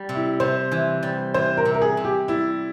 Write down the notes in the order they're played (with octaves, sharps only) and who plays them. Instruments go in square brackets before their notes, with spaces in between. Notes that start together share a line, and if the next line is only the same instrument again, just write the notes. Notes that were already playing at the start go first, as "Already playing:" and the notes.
Already playing: [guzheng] G3
C3
[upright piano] E4
[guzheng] C3 [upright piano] C5
[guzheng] E3
G3
[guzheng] E3 [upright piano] C5
[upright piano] A#4
[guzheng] C3
[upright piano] A#4
G#4
[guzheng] C3
[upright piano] G4
[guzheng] G3 [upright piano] E4